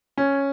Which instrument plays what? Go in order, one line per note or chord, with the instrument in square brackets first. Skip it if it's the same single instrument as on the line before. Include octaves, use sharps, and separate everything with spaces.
[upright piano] C#4